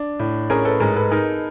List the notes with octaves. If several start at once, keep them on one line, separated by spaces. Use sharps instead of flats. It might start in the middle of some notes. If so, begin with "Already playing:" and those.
Already playing: D4
A2
C#4 G#4 A#4
A4 B4
G#2 G#4 A#4
A4 B4
D#4 G#4 A#4